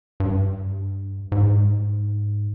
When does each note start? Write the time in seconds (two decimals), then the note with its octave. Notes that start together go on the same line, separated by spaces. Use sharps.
0.20 G2
1.32 G#2